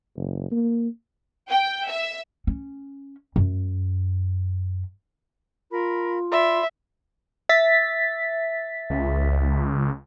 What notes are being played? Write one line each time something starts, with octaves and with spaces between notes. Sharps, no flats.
F#1
A#3
G5
E5
C#4
F#2
F4 A#4 B5
D5 E5 B5 C6
E5 A6 B6
C#2